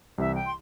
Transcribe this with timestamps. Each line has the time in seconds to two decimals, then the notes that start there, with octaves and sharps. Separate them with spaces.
0.18 C2 C3 E3 E5
0.35 G5
0.45 C6